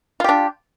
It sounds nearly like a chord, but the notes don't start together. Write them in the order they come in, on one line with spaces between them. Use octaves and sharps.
F4 G4 D4